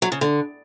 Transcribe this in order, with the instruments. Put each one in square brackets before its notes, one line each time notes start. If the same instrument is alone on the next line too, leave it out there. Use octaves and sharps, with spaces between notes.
[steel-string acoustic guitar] F#3
C#3
D3